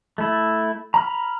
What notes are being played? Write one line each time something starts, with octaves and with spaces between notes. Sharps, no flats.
A3 E4
A#5 B5 F6